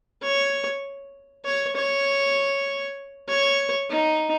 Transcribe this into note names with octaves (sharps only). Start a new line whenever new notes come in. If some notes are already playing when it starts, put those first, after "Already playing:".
C#5
C#5
C#5
C#5
D#4